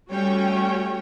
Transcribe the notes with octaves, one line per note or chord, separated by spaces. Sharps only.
G3 A3 C#4 F#4 C#5 G5